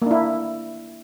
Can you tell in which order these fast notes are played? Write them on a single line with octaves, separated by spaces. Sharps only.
A#3 D4 E4